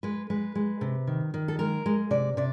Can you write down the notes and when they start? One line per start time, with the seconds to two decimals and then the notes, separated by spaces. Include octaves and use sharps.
0.03 G#3 B4
0.30 G#3 B4
0.55 G#3
0.81 C3
1.07 D#3
1.34 D#3
1.48 A4
1.59 G#3 A#4
1.86 G#3
2.11 C3 D5
2.37 C3 D5